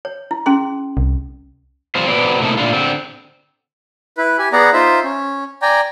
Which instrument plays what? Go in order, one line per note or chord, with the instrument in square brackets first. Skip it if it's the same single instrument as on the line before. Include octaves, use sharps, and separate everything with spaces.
[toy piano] C#5
E4
C#4 G#4 C6
[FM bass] C2
[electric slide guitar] G3 C4 F4 C5
F#3 B3 C4 D5
A2 C3 A3 A#3 D#4 E4
A#2 D3 D4 F4
D3 C4
[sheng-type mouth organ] E4 B4
G4 G#5
B3 G#4 D5 F#5 A#5
D#4 F4 C5 E5
C#4
D5 G5 G#5 A#5